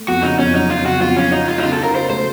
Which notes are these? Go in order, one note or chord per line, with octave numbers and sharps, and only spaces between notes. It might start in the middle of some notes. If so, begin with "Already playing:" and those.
Already playing: A3
F2 F#4
C#3 D#4
F2 C#4
F#3 D#4
F2 F4
C#3 F#4
F2 F4
F#3 C#4
D#4 F#4
A3 F4
D#4
C#3 F4
A4
D#4
A#4
F#4 C5
A3 C5